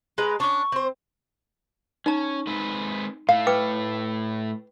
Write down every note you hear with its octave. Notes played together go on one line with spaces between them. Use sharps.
G#3 B4 A#5
C#4 D4 C#6
C4 C5
C#4 D#4 A#5
G#3 C4 B4
A2 A3 F5
B4 G5 D6